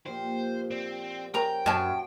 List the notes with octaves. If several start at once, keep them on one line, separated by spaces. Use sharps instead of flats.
A#2 F3 G4 C5
C4 D5
C#4 A#4 G5 G#5 A#5
F#2 F#4 G#5 A5 C6